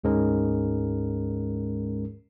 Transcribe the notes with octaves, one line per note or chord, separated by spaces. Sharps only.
D2 G#2 G#3 C#4 A#4